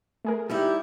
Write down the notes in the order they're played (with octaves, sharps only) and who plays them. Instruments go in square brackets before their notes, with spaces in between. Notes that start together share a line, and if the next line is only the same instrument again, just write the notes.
[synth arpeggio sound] A3 G#4 A#4
[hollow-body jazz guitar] G3 D#4 E4 [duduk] G4